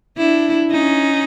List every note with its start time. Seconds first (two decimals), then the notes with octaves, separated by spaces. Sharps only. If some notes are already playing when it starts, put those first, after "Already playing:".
0.17 D4 E4
0.71 C#4 D#4